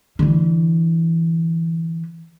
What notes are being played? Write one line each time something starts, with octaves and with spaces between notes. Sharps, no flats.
D3 E3